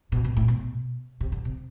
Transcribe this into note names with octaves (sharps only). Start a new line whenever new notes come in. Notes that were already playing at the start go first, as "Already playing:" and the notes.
B2
B2
A2
B2
C3
D3
C3